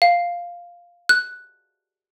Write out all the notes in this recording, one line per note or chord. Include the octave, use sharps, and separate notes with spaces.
F5
F#6